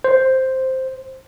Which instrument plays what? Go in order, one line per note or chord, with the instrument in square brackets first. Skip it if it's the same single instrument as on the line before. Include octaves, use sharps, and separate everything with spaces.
[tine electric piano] C5